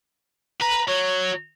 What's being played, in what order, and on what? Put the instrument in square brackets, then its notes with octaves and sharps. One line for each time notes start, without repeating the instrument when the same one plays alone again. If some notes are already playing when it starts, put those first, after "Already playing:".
[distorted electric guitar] B4 [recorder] A#5
[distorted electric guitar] F#3 [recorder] C#5